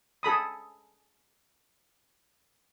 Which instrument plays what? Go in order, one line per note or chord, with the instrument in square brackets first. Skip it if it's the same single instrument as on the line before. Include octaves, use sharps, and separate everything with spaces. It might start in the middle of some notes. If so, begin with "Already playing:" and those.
[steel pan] G#4 A4 B5 D#6